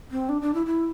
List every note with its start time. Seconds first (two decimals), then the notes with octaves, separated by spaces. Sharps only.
0.11 C4
0.29 D4
0.42 D4
0.54 E4
0.66 E4